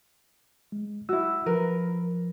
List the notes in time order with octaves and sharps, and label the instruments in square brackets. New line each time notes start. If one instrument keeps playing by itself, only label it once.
[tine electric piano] G#3
[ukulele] E4 F#4 [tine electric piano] E6
[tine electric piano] F3 [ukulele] A#4 B4